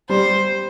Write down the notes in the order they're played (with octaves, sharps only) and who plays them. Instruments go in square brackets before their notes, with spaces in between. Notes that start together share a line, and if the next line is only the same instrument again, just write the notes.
[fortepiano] G3 [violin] C5